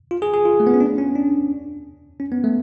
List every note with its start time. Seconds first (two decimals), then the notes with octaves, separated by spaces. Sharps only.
0.11 F4
0.22 G#4
0.33 G#4
0.45 F4
0.60 A3
0.67 B3
0.74 C#4
0.80 D4
0.98 C#4
1.15 D4
2.20 C#4
2.32 B3
2.44 A3